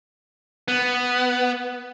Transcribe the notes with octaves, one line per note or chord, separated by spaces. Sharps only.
B3